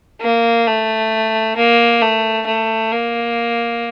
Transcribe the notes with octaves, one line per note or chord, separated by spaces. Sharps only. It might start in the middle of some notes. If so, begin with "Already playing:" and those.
A#3
A3
A#3
A3
A3
A#3